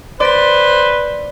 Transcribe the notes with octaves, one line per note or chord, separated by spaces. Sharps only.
B4 C5 D5 B6